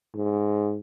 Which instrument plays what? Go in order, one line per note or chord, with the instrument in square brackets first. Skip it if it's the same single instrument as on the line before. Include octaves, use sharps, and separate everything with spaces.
[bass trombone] G#2